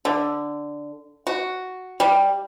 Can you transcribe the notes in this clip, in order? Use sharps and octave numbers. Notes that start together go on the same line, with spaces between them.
D3
F#4
G3